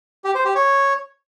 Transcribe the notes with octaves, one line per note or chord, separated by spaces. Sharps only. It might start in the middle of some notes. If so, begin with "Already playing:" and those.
G4
C5
G4
C#5